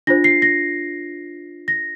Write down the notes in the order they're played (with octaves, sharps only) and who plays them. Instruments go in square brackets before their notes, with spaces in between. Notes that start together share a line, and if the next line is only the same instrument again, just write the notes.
[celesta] D4 F4 C5 A#6
C7
A#6
A#6